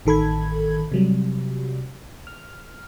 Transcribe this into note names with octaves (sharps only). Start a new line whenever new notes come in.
A1 D#3 A4 B5 G#6
C3 F#3 G3
F6